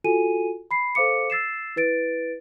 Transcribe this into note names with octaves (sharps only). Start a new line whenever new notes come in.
F4 F#4 A4 G#5 D#7
B5 C7
A4 C5 F5 D6 C#7
E6 A6 C7 E7
E4 B4 A6 D7